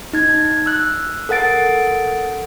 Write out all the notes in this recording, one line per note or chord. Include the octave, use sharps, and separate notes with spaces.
D#4 G#6
E6 F#6
A4 A#4 F#5 A6 D7